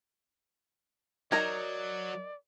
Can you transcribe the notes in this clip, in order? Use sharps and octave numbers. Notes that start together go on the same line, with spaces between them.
F#3 D#4 A#4 D5 G#6